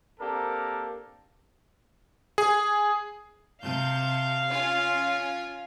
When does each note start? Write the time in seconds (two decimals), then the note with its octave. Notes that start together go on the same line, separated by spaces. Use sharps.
0.20 A#3 C4 D4 G4 A4 A#4
2.38 G#4
3.63 C3 F5 A5 G6
4.49 C#4 F4 G#5